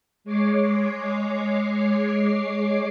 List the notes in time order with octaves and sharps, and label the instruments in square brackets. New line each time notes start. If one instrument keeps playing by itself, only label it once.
[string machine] G#3 C#5 D6 C7